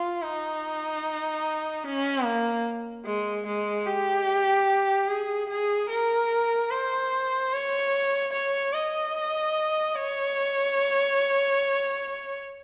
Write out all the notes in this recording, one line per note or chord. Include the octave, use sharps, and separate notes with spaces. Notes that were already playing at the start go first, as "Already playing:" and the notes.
Already playing: F4
D#4
C#4
A#3
G#3
G#3
G4
G#4
G#4
A#4
C5
C#5
C#5
D#5
C#5